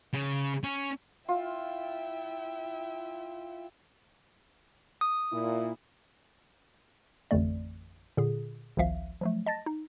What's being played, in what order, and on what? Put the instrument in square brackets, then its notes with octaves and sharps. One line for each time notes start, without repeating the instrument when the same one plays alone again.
[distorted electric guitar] C#3
C#4
[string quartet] E4 E5 G5 [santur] F4
[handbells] D#6
[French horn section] A#2 E4
[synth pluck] A1 F2 D3 A3 D5
A#2 D3 G#4
G#1 C#2 F3 E5 F5
F3 F#3 A3
D#5 A5 A6 A#6
D#4